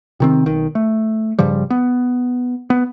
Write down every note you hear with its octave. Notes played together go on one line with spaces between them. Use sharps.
C3 D#3 C4
B1 D#3
A3
G2 C#3 F3 G3
B3
B3